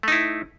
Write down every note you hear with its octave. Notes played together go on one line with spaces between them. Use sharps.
A3 D#4 E4